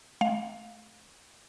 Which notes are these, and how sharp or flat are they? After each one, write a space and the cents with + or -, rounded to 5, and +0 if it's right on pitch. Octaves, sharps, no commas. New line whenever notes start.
A3 -35 F5 +15